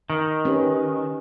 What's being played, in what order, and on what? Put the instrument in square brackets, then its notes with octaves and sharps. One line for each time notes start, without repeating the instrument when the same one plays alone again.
[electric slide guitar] D#3
[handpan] C#4 G4 B4